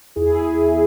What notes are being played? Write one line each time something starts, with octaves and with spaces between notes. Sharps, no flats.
E2 E4 G#4